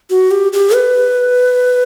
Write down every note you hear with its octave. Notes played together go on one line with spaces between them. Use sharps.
F#4
G4
G4
B4